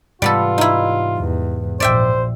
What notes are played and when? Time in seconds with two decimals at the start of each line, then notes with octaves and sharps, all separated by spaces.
0.22 G#2 C3 E3 G3 B3 F4 A4
0.58 D#4 E4
1.17 E2
1.80 A#1 C5 D5 E5 G5